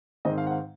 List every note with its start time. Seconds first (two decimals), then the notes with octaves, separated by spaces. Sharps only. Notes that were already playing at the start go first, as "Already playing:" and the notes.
0.25 G#2 D#3 G#3 C4 D#5
0.38 F5
0.47 F#5
0.51 F5